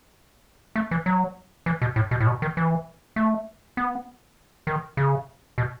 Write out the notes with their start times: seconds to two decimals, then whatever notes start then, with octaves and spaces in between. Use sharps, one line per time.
0.76 A3
0.91 E3
1.06 F#3
1.66 E3
1.82 B2
1.96 A2
2.11 B2
2.20 A2
2.27 B2
2.42 D#3
2.57 E3
3.16 A3
3.77 B3
4.67 D#3
4.97 C#3
5.58 B2